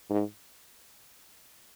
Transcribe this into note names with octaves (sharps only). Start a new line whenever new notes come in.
G#2